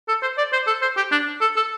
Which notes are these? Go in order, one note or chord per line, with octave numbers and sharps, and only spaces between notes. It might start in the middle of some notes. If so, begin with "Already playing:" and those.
A4
C5
D5
C5
A4
C5
G4
D4
A4
A4